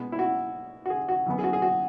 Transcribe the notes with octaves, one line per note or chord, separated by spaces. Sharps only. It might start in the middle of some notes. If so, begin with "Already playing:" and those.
Already playing: B2 G#3 B3
E4
F#4
F#4
G#4
F#4
F#2 E3 B3
G#4
F#4
G#4
F#4